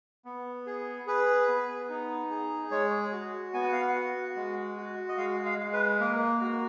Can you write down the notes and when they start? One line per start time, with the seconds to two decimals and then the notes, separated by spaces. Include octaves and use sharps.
0.25 B3
0.67 G#4
1.07 G#4 B4
1.48 B3
1.89 D#4
2.30 G#4
2.71 G#3 C#5
3.12 F#4
3.54 B3 G#5
3.63 F#5
3.72 F5
3.82 F#5
3.95 F#4
4.36 G#3
4.77 F#4
5.09 D#5
5.17 G#3 F5
5.46 F5
5.58 G#3
5.73 B4
6.00 A#3 A#4
6.41 F#4